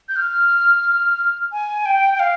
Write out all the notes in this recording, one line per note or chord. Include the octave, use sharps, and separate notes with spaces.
G6
F6
G#5
G5
G5
F5